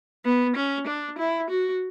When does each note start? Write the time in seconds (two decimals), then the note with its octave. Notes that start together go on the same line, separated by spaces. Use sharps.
0.25 B3
0.56 C#4
0.87 D4
1.18 E4
1.50 F#4